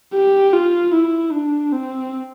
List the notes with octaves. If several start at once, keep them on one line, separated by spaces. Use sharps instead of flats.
G4
F4
E4
D4
C4